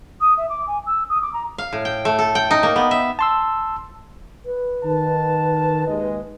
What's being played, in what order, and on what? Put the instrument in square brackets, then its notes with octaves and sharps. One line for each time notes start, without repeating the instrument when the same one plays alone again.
[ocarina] D#6
E5
D6
G#5
E6
D#6
D6
A#5
[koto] F5
A2
G5
A3
A4
G5
D#4
A#3
B3
E5
[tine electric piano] A5 C6 E6
[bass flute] B4
[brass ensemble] D#3 A5
D#2 G#3 D#5